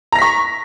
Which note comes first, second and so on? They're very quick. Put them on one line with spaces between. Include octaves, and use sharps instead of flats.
A#5 A#6 B6 C#6